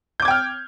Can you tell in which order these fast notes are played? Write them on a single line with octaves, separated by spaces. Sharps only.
G6 D6 G#6 G5 F6